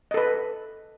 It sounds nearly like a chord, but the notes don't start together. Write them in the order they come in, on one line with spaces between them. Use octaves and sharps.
D#5 A4 B4